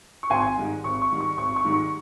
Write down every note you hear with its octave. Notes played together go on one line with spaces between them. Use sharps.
C#6
G#1 G#5 C6
G#2 D#3 G3
G#1 C#6
C#6
G#2 D#3 G3
C#6
G#1 C#6
C#6
G#2 D#3 G3
C#6